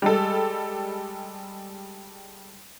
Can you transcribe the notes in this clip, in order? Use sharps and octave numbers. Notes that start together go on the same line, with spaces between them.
G3 G#3 A4